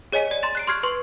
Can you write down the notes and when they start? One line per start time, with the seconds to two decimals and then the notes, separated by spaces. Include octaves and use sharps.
0.13 G#4 C#5 D#5 G#5 B6 D#7
0.31 D5
0.42 A#5 C6 A6 E7
0.55 F#6 C7 D7
0.67 C6 C#6 F6 G#6 C7
0.83 B4 C6 C#6